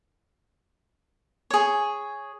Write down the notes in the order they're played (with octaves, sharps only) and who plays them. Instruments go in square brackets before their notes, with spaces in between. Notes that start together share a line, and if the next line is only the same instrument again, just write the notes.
[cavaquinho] G#4 C#5